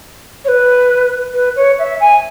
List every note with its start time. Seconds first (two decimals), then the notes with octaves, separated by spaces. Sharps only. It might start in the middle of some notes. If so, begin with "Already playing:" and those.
0.45 C#5
0.48 B4
1.34 B4
1.56 C#5
1.79 E5
2.00 G#5